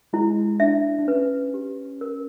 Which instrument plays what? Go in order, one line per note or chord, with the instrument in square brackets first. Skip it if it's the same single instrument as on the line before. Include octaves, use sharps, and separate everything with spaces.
[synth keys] G#3 [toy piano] E4
[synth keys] D4 [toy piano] E5
[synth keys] D4
[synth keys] C#4 [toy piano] B4
[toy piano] G4
A#4